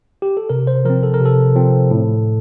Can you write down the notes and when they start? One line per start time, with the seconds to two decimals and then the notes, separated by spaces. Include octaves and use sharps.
0.22 G4
0.37 A4
0.49 C3 A#4
0.67 C5
0.85 F3 C4 A#4
1.03 A4
1.14 A#4
1.20 C3
1.26 A4
1.55 F3 C4
1.91 A2